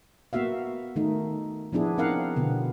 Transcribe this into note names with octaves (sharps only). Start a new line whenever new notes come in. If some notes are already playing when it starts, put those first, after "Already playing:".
A#3 B3 F#4 E5 F5
D#3 A3 D#4
F3 B3 D4 E4 G#4
C4 D#4 A#4 F5 F#5
B2 D3 B3